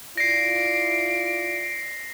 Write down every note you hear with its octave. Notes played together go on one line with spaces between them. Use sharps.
E4 F4 D5 A#6 C7 D7